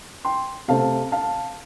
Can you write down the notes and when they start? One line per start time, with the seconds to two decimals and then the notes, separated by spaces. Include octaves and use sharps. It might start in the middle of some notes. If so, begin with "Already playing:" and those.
0.25 G5 C6
0.68 C3 A3 C4 F5 A5
1.12 F5 A5